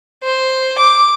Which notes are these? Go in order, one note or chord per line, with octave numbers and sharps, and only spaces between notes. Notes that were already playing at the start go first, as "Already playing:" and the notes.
C5
D6